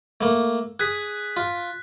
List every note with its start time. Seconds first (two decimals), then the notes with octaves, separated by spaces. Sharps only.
0.21 A3 A#3
0.80 G#4 F#6 B6
1.37 F4